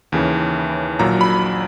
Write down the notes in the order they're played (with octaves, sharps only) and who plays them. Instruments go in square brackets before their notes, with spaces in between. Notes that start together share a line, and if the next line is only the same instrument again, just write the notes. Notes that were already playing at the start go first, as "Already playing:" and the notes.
[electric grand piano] D#2 C#3 E3
A#1 A#2 F#3 A#5
B5